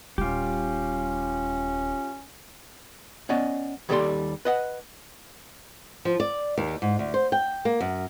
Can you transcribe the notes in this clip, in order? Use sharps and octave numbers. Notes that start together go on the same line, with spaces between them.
D#1 G3 C#4 F4 G4
B3 C#4 D5 D#5
D#2 G3 G4 A4 D5 C6
B4 D#5 F#5
F3
D5
D#2
G#2
D2
C5
G5
A#3
F#2